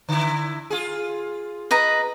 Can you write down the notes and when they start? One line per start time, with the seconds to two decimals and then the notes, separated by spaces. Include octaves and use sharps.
0.09 D3 E4
0.70 F4 G#4
1.71 B4 D#5 A#5